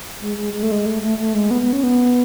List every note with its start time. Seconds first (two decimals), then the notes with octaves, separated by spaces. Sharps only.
0.21 G#3
0.38 G#3
0.53 G#3
0.63 A3
0.71 G#3
0.86 A3
1.02 A3
1.18 A3
1.35 G#3
1.51 B3
1.62 B3
1.73 C#4
1.83 B3